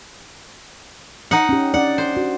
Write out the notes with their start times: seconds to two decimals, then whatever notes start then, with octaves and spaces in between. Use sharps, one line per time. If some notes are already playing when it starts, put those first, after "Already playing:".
1.31 D#4 F#5
1.49 C#4 G4
1.74 C#4 D4 D5 F#5
1.98 C5
2.17 F#4